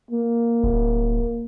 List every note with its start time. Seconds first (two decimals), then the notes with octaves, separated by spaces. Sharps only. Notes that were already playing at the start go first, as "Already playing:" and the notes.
0.11 A#3
0.64 D1